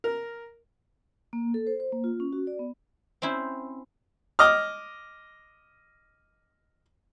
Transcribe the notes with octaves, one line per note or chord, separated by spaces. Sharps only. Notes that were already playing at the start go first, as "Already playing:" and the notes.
A#4
A#3
A4
C5
C5
A#3
F4
C#4
F#4
D5
B3
C4 C#4 E4 C5
D#5 D6 F6